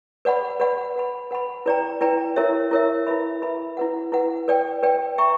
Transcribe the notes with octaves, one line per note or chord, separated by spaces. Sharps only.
B4 D5 F#5 B5
B4 D5 F#5 B5
B4 F#5 B5
B4 F#5 B5
E4 B4 D5 G5 A#5
E4 B4 D5 G5 A#5
E4 A#4 C#5 E5
E4 A#4 C#5 E5
E4 B4 E5 B5
E4 B4 E5 B5
E4 B4 F#5
E4 B4 F#5
B4 D5 G5
B4 D5 G5
B4 E5 G5 A#5 C#6